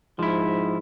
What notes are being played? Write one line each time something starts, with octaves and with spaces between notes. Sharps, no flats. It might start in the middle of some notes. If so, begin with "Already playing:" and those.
G#2 F3 E4